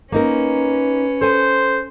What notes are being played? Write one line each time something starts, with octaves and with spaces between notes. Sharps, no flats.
A#3 C#4 D#4 A#4 B4
A4 C5 G#5